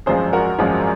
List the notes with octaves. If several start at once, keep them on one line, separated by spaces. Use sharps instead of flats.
G#1 F#2 F3 G#3 G#4 C5
F#4 A#4
G#1 F#2 F3 G#3